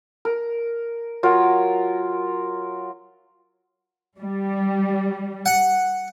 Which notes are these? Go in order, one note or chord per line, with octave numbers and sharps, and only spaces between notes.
A#4
F#3 F4 A#4
G3
F#5